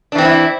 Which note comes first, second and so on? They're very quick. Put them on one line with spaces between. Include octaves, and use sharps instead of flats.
D4 E3 C4 B3 E4